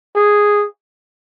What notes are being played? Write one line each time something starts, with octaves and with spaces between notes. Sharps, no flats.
G#4